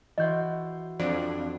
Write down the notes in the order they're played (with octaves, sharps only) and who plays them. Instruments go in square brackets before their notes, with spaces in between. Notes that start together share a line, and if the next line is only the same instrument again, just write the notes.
[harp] E3 F#4 C5 [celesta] D#5 G6
[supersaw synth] F2 [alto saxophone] D4